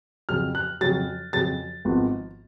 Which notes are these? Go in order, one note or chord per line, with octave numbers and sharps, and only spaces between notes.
F2 C#3 F#3 F6
F#6
F2 C#3 F#3 A6
F2 C#3 F#3 A6
G#1 G#2 F3 B3